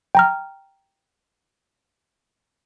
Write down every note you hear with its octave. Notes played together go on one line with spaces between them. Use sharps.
G5 A#5 F6